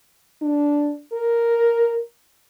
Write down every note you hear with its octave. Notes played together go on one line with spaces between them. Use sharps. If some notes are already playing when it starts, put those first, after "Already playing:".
D4
A#4